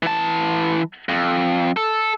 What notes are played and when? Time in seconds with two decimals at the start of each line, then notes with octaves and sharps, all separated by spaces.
0.03 E3 A5
1.09 F2
1.77 A4